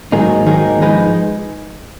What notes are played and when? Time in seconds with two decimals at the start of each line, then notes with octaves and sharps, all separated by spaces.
0.12 G#2 D#3 F#3 A#3 D#4 G#4
0.47 D#3 F#3 A#3 D#4 G#4
0.81 F3 G#3 D#4 G#4 B4